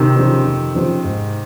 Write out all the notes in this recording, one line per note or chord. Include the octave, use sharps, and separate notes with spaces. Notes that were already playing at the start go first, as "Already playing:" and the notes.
Already playing: C3 D#3
C#3 F3 C4 G4
F2
C#3 F3 C4 G4
G#2